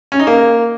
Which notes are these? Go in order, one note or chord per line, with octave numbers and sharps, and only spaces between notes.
C#4
D#4
A#3